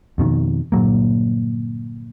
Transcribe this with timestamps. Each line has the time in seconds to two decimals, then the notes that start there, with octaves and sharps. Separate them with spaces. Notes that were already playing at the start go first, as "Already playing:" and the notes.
0.18 F2 B2 D#3
0.72 G1 A#2 F#3 A#3